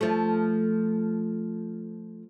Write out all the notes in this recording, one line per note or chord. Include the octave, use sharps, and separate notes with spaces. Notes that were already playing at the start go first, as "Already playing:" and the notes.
F3 A3